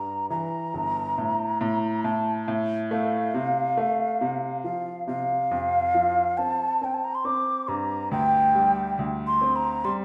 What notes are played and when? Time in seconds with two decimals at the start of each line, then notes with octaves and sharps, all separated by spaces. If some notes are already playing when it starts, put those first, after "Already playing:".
Already playing: G2 A#5
0.30 E3 A#5
0.74 G1
1.18 A2
1.61 A2
2.04 A2 A5
2.48 A2
2.91 A3 F5
3.34 C3
3.77 A3
4.21 C3
4.64 F3 F5
5.08 C3 F5
5.51 F2
5.94 F3
6.38 C4 A5
6.81 C4 G5
6.94 A5
7.04 A#5
7.15 C6
7.25 C4 D6
7.68 G2 A#5
8.11 D2 G5
8.55 G3
8.99 D2
9.27 C6
9.41 C4
9.56 A#5
9.85 G3 C6